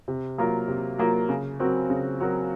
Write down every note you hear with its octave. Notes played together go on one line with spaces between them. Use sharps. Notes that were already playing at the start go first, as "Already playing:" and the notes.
C3
F#3 A#3 F4 A#4
C3
F#3 A#3 F4 A#4
C#3
F#3 C4 F#4 A#4
C#3
F#3 C4 F#4 A#4